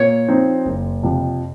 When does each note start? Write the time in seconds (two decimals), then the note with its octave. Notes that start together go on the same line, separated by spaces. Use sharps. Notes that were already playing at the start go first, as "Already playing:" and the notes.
Already playing: A#2 C#5
0.28 F3 C4 D#4
0.66 F#1
1.03 F2 C3 F3